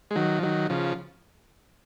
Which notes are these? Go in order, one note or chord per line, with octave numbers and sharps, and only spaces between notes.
G#3
D#3 F#3
F3
D#3 F#3
C#3 F3